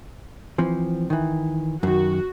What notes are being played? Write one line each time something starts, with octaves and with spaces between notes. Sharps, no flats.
E3 F3 C4
D#3 E3
F#2 D#3 F#4